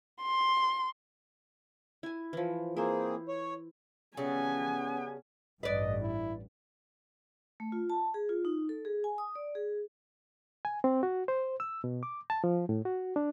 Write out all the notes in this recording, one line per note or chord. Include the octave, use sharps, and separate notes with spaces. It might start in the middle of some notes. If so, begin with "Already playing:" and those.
C6
E4 G#5
E3 F3
A#3 C4 E4 G#4 C5
C#5
C#3 G3 B3 C#4 A4 G#5
A1 G2 B4 D5 D#5
E4
A3
F4
A5
G#4
F4
D#4
A4
G#4
G#5
D#6
D5
G#4
G#5
C4
F#4
C5
E6
B2
D6
A5
F3
A2
F#4
D4